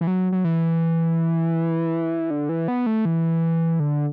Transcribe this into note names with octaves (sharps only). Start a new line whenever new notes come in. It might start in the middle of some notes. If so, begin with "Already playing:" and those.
E3
F#3
F#3
E3
D3
E3
B3
A3
E3
D3